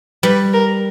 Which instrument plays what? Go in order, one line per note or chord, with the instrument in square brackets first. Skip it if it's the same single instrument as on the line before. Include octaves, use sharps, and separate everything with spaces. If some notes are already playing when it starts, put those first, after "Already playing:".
[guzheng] G3 [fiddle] B4
[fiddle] A#4